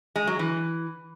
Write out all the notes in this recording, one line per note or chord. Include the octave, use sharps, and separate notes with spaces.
G#3
F#3
E3